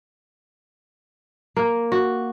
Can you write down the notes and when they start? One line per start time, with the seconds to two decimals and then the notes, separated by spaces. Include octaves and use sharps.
1.56 A#3
1.92 F#4